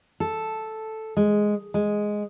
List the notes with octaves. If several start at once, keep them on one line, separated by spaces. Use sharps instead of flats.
A4
G#3
G#3